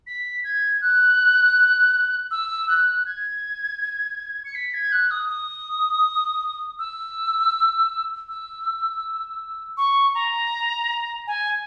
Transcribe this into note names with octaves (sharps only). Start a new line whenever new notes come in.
B6
G#6
F#6
E6
F#6
G#6
C#7
B6
G#6
F#6
D#6
D#6
E6
E6
C#6
A#5
G#5